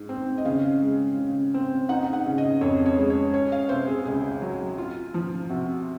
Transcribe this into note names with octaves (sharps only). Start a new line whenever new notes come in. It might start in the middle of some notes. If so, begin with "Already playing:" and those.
Already playing: G#2
C4
D#5
C#3 F5
G#3
C#3
C4
D#4 F#5
F#5
C#3
D#5
F2 C#5
C#5
G#3
C#5
C#4 C#5
F5
C3 C5
G#4
C#2 G#4
F#3
F4
F3
C3 F#4